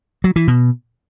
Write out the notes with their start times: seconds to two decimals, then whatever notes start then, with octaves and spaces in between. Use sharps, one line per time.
0.24 F#3
0.36 E3
0.48 B2